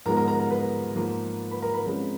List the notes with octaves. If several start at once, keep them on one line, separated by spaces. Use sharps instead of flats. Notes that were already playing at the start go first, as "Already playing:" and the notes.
G#2 F3 G#3 B3 A#4 A#5
A#4 A#5
A#4 A#5
A#4 A#5
B4 B5
G#2 F3 A#3
B4 B5
A#4 A#5
B4 B5
C#3 F3 G#3 C4